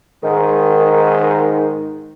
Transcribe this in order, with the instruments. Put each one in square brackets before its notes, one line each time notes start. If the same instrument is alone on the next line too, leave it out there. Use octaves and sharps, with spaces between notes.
[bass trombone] G#2 [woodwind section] D#3